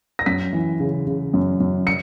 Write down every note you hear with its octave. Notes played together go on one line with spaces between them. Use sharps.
A#6
F#2 B6
E3
C#3
C#3
F#2
F#2
C#7